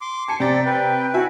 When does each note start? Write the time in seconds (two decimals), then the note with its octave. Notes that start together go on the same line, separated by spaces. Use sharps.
0.01 C6 D6
0.28 G#5 A5 C#7
0.40 C3 D5 G5 A#5 A6
0.66 B4 G5
1.14 E4 F#4 E5 G#5